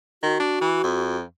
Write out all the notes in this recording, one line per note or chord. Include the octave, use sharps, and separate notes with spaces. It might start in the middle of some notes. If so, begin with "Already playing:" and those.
D#3 F#4
D4
E3
F2